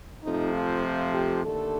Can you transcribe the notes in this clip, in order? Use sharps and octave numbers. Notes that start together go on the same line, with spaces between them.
F2 C3 F3 A3 D#4
F4
F4
G4
D#2 D3 A3 A4